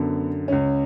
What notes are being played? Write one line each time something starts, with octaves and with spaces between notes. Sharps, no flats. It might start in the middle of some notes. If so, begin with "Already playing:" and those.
Already playing: F#2 D3 B3
C#2 C#3 C#4